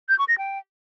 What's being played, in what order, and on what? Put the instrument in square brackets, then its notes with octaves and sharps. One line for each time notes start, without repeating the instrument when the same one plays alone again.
[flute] G6
C#6
A#6
G5